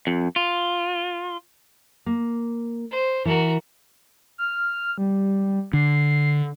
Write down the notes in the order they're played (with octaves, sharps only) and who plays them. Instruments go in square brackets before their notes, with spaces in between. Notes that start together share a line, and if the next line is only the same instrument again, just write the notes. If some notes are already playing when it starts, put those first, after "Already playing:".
[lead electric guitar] F2
F4
[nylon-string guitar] A#3
[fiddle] C5
[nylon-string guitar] E3 [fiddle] F#4 A#4
[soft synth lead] F6
G3
[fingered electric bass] D3 [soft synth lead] C7